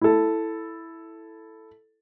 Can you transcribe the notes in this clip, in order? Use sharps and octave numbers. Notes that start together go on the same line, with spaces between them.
E4 A4